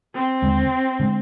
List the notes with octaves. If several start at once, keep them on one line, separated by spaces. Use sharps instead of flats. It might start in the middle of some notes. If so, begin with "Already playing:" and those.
C4
D#2 D3 G#3
D3 G#3